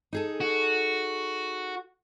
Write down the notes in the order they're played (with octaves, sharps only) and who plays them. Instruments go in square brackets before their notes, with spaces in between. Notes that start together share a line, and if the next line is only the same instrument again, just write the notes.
[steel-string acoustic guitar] D#4 G#4 A4
[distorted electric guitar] F#4